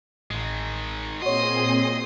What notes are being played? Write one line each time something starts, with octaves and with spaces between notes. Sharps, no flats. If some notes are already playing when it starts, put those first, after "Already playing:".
A1 D#3 G#3
A#2 C4 F#4 G#4 C#5 D#5 C6 D#6